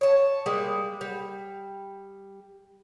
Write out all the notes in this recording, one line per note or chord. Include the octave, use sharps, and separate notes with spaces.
C#5 A5
G3 G#3 A#3
G3